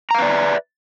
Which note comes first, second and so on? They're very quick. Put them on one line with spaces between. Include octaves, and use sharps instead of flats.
A#5 F5 B4 D5 E5